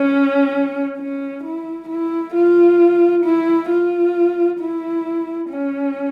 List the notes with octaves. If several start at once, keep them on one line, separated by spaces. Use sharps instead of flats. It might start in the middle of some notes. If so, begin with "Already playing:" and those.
Already playing: C#4
C#4
E4
E4
F4
E4
F4
E4
C#4